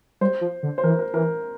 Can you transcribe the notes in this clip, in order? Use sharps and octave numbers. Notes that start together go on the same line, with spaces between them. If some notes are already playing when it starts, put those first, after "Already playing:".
G3 C5
F3
D3
C5
E3 A#4
A#4
E3 A#4